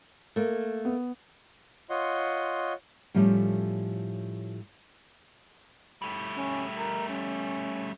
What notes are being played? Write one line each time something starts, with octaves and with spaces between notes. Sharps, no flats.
A3 A#3
B3
F4 C#5 D#5 F#5 C6
A2 F3 G3 A3 C#4
G3 A3
C#4
A#4
C#4